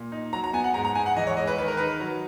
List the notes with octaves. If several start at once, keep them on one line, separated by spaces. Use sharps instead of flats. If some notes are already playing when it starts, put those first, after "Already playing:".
Already playing: A#2
D#4
F#3 A#5
A#5
B3 G#5
F#5
G#2 A#5
A#5
G#2 G#5
F#5
E3 D#5
C#5
G#3 D#5
B4
D#3 B4
A#4
D#4 B4
F#3